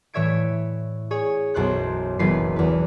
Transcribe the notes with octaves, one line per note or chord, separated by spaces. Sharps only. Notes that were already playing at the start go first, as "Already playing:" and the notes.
A2 E3 C#5 E5 G#6 D7
G#4 C#5
B1 F#2 C5 F#6 G6
F#1 B1 E3 B4 C7
E2 B4